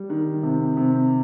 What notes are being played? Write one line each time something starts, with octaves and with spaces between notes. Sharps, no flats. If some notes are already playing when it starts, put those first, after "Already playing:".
Already playing: G3
D#3
C3
C3